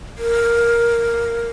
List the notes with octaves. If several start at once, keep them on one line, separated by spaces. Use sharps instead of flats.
A#4